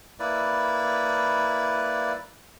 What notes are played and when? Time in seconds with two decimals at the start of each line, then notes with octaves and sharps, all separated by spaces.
0.20 A#3 E4 B4 D5